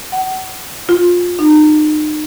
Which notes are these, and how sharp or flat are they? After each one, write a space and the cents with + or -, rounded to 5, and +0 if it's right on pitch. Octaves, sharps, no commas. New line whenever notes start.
F#5 +25
F4 +20
D#4 -35